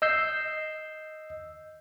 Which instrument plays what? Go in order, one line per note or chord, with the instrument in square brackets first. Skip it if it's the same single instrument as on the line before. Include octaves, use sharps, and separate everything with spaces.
[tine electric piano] D#5 E6 G6 C7